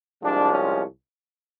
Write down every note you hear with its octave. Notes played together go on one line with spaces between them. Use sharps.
C2 C3 F3 G#3 D4
C#4